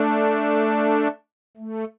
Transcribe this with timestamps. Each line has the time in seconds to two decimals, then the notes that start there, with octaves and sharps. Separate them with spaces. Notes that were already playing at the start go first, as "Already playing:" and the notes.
Already playing: A3 D4
1.57 A3